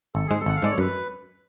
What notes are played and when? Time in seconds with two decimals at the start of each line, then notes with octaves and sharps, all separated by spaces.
0.15 G#1 A4
0.27 G#2 G#3 G#4
0.40 A4
0.46 G#1 F#5
0.56 F5
0.62 G#2 G#3 D5
0.71 C#5
0.78 F#2 B4